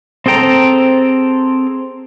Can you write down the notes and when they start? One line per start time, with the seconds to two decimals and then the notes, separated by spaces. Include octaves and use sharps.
0.26 C4 G#4 A4 G5 A#5